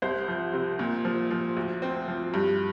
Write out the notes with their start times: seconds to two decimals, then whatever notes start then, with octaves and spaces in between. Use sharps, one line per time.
0.02 C2 C5
0.28 F3
0.54 C3
0.79 A#2
1.05 F3
1.31 F3
1.57 D2
1.82 C4
2.08 F3
2.34 G2